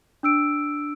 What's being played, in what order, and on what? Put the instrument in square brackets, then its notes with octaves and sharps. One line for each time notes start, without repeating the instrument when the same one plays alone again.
[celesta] D4 E6 D7